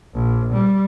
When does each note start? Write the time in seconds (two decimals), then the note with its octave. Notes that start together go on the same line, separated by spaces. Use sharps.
0.14 A#1
0.53 G3